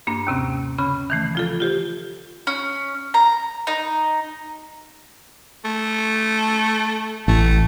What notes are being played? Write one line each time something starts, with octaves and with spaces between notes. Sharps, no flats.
G2 A#3 D4
D#2 C3 C4 C#4
C#3 C#4 B5
D#3 E3 A3
F3 F4 A4
F4 G4 C5
C#4
A#5
D#4
A3
A1 A3